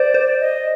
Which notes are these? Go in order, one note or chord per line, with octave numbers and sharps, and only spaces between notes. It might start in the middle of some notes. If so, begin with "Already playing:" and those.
Already playing: C5 D5
C5
D#5